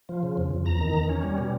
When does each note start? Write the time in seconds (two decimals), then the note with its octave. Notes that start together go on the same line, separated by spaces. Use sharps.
0.09 F3
0.23 C#3
0.37 F2
0.51 F2
0.65 E2 A#5
0.81 D#3
0.94 E2
1.09 C#4
1.23 G3
1.38 B2